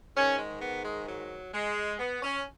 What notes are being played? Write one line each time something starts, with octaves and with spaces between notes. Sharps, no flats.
G#2 D#3 C#4
G#3
B3
G#3
F#3
G#3
B3
C#4